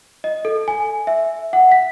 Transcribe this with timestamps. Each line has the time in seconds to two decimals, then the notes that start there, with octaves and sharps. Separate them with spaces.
0.24 D#5
0.45 A4
0.68 G#5
1.07 E5
1.53 F#5
1.72 B6